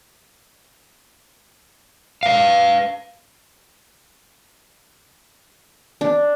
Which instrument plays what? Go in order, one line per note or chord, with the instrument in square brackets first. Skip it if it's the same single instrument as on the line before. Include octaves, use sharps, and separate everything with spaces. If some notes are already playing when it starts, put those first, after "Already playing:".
[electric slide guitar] B4 F5
[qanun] D4